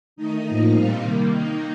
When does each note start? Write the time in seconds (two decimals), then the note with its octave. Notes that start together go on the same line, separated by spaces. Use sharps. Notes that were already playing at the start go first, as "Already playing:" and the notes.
0.16 D#3 A3 D#4 D#5
0.44 A2 F3 A#3 D#4
0.73 A#2 G3 C4 D#4 F5
1.01 C3 D#3 G3 A#3
1.29 D#3 A#3 D#4